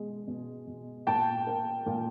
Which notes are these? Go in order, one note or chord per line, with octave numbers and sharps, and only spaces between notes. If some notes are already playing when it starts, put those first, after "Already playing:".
Already playing: B2 G#3
B2
B2
A#2 G5 A5
A#3
A#2